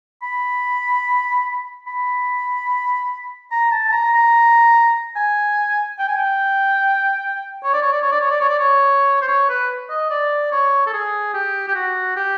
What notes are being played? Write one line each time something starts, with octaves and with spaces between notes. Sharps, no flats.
B5
B5
A#5
A5
A5
A#5
A#5
G#5
G5
G#5
G5
C#5
D5
C#5
D5
C#5
D5
C#5
D5
C#5
D5
C#5
C5
C#5
B4
D#5
D5
C#5
A4
G#4
G4
G4
F#4
G4